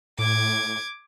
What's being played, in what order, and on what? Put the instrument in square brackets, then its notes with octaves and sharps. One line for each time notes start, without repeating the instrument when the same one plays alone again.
[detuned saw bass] A2 [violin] D6 G#6